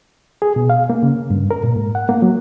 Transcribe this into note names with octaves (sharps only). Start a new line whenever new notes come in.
G#4
B2
F5
A#3
C#3
G2
A#4
A#2
G#2
F#5
A#3
F#3